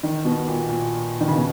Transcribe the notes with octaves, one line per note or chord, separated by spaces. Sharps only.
D#3
B2
A#2
A#2
D#3
C#3
B2